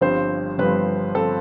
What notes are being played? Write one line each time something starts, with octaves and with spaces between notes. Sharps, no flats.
G1 G2 F3 C4 C5
G1 G2 F3 C4 B4
F3 C4 A4